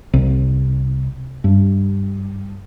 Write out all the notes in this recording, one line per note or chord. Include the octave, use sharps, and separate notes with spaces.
C2
G2